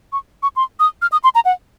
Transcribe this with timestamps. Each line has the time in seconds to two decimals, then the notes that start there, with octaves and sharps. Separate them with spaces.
0.13 C#6
0.43 C#6
0.56 C6
0.80 D#6
1.02 F6
1.12 D#6
1.24 C6
1.35 A#5
1.45 F#5